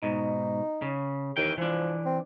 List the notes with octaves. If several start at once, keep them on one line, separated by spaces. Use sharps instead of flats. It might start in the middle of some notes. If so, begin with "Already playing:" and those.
G#2 B2 D#4
C#3
D#2 D#3 E3 G5
E3 F3 D4
C4